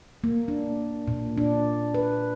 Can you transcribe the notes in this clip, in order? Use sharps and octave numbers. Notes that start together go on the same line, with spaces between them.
A#3
D4
A#2
D4
B4